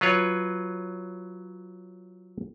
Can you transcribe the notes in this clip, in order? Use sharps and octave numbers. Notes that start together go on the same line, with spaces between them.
F#3 F4 B4 C#5